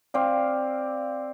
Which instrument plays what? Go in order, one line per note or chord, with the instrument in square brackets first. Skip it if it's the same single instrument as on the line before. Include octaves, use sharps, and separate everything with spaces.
[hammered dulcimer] C4 D5 F5